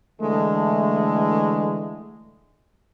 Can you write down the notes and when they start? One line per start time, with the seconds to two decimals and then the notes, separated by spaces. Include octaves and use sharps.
0.21 D3 E3 G#3 A3